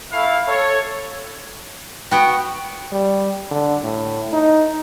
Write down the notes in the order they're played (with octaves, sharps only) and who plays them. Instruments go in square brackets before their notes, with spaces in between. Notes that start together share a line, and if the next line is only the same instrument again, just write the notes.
[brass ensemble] A3 E4 F5
A4 C#5
[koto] B3 F#4 [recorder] G5
[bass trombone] G3
D3
A2
D#4